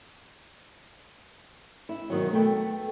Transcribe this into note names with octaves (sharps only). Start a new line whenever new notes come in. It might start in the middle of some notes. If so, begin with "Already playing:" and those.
E4
B2 D#3 F#3
A3 B3 G5